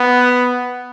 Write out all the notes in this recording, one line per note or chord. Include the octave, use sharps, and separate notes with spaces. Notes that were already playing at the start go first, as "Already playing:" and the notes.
Already playing: B3